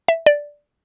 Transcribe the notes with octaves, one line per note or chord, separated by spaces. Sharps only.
E5
D5